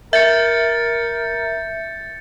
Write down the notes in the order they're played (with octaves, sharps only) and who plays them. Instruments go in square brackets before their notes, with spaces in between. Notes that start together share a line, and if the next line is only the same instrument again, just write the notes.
[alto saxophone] A#4 [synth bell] E5 [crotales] G6 A6 C#7